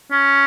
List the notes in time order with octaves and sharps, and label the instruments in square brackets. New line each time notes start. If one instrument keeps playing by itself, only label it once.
[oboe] C#4